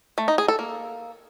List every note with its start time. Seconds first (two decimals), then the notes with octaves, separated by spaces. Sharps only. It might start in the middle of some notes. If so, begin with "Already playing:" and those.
0.18 A3
0.28 D#4
0.38 G#4
0.48 A4
0.59 A#3